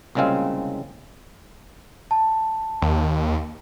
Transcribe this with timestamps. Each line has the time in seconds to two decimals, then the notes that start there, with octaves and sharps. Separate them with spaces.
0.15 C2 A#2 C#3 G#3 C4 F5
2.11 A5
2.82 D#2